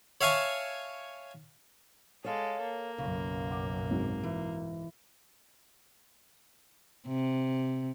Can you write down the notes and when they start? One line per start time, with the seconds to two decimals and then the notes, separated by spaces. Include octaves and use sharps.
0.21 C#5 E5 F5 G#5 A5 C#6
2.25 G#3 A4 C#5 F5
2.62 A#3
2.98 B1 F#2 C#3
3.51 F#5 D6
3.91 G#2 F#3 C4
4.23 E3
7.08 C3